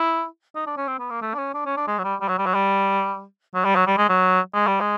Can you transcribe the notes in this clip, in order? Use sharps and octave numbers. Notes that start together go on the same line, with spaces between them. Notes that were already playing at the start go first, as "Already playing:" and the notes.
Already playing: E4
D#4
D4
C#4
C4
B3
A#3
A3
D4
C#4
D4
C#4
D4
G#3
F#3
G3
G3
F#3
G3
F#3
G3
F#3
G3
F#3
G3
G#3
F#3
G#3
G3
G#3